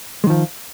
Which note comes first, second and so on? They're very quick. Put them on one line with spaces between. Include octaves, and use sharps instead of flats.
G#3 D#3 F3